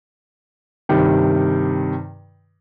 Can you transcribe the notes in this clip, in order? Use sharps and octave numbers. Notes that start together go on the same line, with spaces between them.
G2 C3 D#3